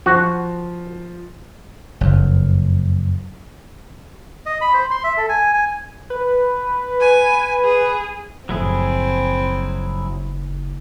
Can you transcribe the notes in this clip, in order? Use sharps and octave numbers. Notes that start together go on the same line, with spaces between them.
F3 F#4
F#1 F2
D#5
B5
C5
C6
E5
A4
G#5
G#5
B4
G#5
G#4
F#1 F#2 A2 F3 F#3 C4 E4 G#4